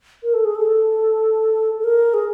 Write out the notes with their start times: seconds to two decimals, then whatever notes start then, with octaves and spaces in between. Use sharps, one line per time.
0.23 A#4
0.34 A4
0.45 G#4
0.55 A4
1.79 A4
1.84 A#4
2.14 G#4